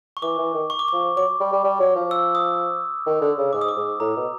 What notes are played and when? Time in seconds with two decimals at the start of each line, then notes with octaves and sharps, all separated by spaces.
0.17 C#6
0.22 E3 D6
0.38 E3
0.54 D#3
0.70 C#6
0.79 D6
0.88 F3 C#6
1.16 F#3 D6
1.40 G3
1.52 G3
1.64 G3
1.80 F#3
1.95 F3
2.11 E6
2.35 D#6
3.06 D#3
3.21 D3
3.37 C#3
3.53 G#2 D6
3.61 D#6
3.68 D6
3.76 G#2
4.00 A2 A#5
4.16 B2